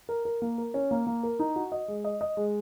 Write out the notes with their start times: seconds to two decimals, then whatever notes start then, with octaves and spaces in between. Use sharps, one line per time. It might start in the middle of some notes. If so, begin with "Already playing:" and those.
0.09 A#4
0.25 A#4
0.42 A#3
0.58 A#4
0.74 C#4
0.91 A#3
1.07 A#3
1.23 A#4
1.39 D#4
1.56 F#4
1.72 D#5
1.88 G#3
2.04 D#5
2.21 D#5
2.37 G#3